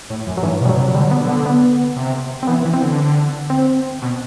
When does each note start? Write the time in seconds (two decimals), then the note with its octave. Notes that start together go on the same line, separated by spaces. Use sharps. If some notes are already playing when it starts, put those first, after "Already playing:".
0.10 A2
0.27 F#2
0.37 F#3
0.43 G2 E3
0.61 B2
0.65 G3
0.69 F#3
0.77 C3
0.88 F#3
0.94 D3 G3
1.11 B3
1.20 D3
1.29 B3
1.46 B3
1.96 C3
2.43 C4
2.47 E3 B3
2.65 E3
2.73 C4
2.82 D3
3.50 C4
4.02 B2